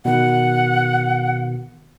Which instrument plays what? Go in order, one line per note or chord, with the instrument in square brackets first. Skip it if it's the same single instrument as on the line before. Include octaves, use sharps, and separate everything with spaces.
[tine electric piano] B2 D#3 [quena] F#5